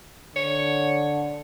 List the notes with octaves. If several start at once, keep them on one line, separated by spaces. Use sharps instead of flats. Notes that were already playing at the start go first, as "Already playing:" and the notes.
D3 C#5